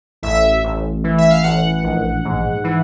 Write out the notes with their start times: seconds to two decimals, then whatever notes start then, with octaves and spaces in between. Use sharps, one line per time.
0.23 A1 E5
0.64 A1
1.04 E3
1.18 E5
1.31 F5
1.43 A1 F#5
1.83 A#1
2.25 G#2
2.64 E3